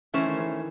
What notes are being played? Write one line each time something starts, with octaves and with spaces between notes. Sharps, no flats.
E3 A3 C#4 E4 C5
D#3
E3